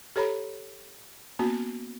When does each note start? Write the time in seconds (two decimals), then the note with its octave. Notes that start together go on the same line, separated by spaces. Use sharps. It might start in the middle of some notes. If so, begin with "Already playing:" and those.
0.16 G4 A4 C#5 A#5 B5
1.39 A#3 B3 C#4 F#4